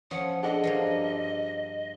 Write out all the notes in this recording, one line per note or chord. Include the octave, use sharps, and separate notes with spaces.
F3 C#4 F#5 D#6
D4 G#4 A4 D#5 F#5
G2 F3 A#3